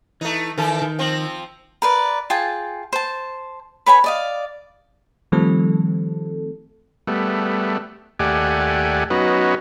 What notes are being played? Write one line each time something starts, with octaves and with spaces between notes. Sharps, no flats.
E3 A3 D#4
D#3 E3 A4
D#3
F3 C4
A#4 B4 D5
F4 G#4 G5 A5
C5 A5
B4 C#5 G#5 B5
D5 D#5 F5
D#3 F3 G3 A3 C4 A4
G3 A3 B3
D#2 A3 G4 D5 F#5 G#5
F#3 B3 C#4 D#4 F#4 B4